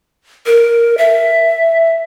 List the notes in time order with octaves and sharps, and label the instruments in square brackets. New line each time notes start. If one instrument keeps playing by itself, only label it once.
[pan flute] A#4
E5